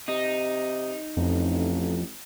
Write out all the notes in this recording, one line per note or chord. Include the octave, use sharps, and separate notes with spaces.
C3 D#4
A1 F2